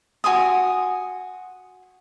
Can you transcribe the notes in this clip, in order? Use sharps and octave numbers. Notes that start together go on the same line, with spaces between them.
F#4 G#5 C6 D#6